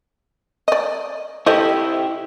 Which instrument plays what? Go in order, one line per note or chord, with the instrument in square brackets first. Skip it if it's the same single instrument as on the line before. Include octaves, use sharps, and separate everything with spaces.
[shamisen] D5 D#5
[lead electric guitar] E4 G4 [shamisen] A4 C5 D#5